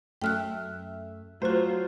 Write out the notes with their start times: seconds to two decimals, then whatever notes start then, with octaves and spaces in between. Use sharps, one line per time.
0.22 F#2 A3 E5 G5 F6 F#6
1.42 F#3 A3 F4 F#4 C5